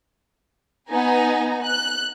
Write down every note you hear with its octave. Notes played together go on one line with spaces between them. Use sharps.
B3 D#4 G#5 A#5
F#6